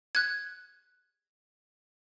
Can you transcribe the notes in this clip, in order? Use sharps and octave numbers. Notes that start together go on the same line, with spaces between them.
F#6 G#6